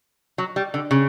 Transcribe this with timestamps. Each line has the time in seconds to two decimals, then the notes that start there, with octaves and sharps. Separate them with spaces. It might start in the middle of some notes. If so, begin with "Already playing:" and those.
0.38 F#3
0.56 G3
0.74 D3
0.91 C#3